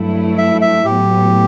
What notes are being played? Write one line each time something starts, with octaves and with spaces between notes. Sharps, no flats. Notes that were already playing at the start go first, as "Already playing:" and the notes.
Already playing: G2 F#3 A3 E4
E5
E5
A2 F#3 B3 G4